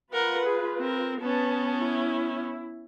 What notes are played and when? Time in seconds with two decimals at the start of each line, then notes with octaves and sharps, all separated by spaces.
0.13 F4 A#4 B4 F#5
0.45 G#4
0.78 C4 A#4
1.21 B3 C#4 B4 A5
1.78 E4